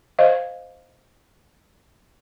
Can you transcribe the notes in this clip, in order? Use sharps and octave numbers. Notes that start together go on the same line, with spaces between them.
C5 D#5 F5